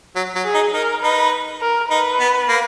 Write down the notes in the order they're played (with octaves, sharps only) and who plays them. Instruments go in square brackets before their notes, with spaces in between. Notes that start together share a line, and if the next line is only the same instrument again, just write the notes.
[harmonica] F#3
F#3
[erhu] G#4
[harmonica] D#4
[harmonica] D#4 [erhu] A#4
[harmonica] D#4 [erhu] B4
[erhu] A#4
[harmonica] D#4 [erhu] B4
[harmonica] B3
A#3